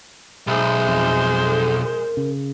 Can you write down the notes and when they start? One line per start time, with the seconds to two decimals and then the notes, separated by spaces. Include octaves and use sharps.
0.47 B1 G#3 C5 E5
0.88 F2
1.44 A4
1.84 A#4
2.17 C#3